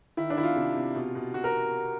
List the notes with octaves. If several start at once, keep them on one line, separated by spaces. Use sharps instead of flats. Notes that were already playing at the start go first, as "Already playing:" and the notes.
D#3 E4
D4
D#3 E4
F4
C3
C3
B2
B2
B2 F#4
A#4